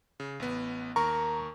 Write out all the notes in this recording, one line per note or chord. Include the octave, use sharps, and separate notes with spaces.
C#3
A1 B3
D#2 A#4 A#5 C#6